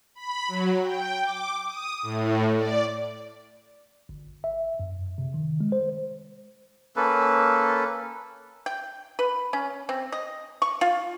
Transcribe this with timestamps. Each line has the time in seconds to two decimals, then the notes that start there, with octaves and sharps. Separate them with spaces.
0.15 B5
0.48 F#3
0.82 G5
1.22 D6
1.68 D#6
2.02 A2
2.56 D5
4.09 G1
4.44 E5
4.80 F#2
5.18 C3
5.34 D#3
5.61 G#3
5.72 C5
6.96 A#3 C#4 A4 B4
8.66 G5
9.19 B4
9.53 C#4
9.89 C4
10.12 D#5
10.62 C#6
10.81 F4